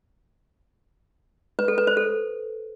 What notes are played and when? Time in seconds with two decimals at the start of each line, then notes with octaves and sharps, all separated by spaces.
1.59 B4
1.68 A4
1.78 B4
1.87 C5
1.97 A4